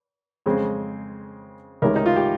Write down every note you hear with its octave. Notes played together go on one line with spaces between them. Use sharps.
F2 C#3 G#3 C4
C#2 C3 D#3 G#3 C#4 A#4
D#4
F4
G4